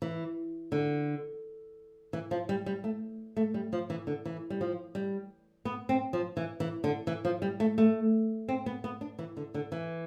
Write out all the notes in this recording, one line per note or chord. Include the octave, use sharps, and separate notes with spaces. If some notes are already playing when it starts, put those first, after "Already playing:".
E3
D3
E3
F3
G3
G3
A3
A3
G3
F3
E3
D3
E3
G3
F3
G3
B3
C4
F3
E3
E3
D3
E3
F3
G3
A3
A3
C4
B3
B3
D4
E3
D3
D3
E3